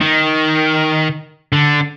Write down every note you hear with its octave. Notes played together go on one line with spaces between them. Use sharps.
D#3
D3